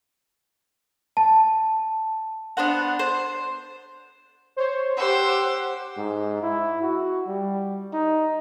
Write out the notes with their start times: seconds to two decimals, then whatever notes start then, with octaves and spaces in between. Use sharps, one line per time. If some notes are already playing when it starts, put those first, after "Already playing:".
1.17 A5
2.57 B3 D4 C5 F#5
2.99 C5
4.56 C5 C#5
4.98 G4 C5 F#5 E6
5.98 G#2
6.43 E4
6.82 F#4
7.27 G3
7.93 D#4